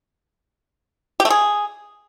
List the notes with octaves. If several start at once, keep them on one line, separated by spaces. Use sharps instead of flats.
G4
A3
G#4